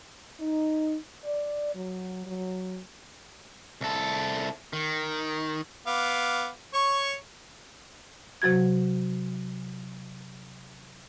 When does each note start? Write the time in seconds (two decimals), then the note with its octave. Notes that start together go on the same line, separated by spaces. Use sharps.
0.40 D#4
1.24 D5
1.74 F#3
2.25 F#3
3.81 C2 A4
4.73 D#3
5.87 B3 F5 D6
6.74 C#5 C#6
8.42 C3 F#3 F#4 G#6